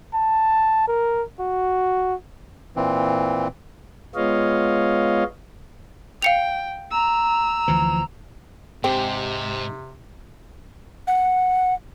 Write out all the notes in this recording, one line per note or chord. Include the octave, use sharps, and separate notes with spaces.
A5
A#4
F#4
A#2 E3 C4
G#3 B3 F4 C#5 D#5 F5
F5 G5 C#7 F7
A#5 E6
D2 E3 F3
G#2 C3 C4 G4
F#5